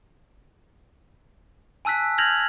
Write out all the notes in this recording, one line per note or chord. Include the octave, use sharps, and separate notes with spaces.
G#5 A5 E6 F#6 B6
F6 G6 G#6 A#6 F7 F#7